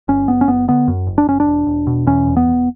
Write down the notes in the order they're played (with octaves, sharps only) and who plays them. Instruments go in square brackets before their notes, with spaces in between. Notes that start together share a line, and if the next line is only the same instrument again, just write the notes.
[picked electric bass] G1 C#4
F#1 B3
C#4
F#1 B3
D3 B3
F#2
F#1
D4
F#1 C#4
D4
E1
E1
B2
E2 C#4
E1
B3
E1